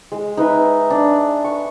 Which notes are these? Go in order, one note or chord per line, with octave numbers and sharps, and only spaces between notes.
G#3
D#4 B4 E5
D4
C#6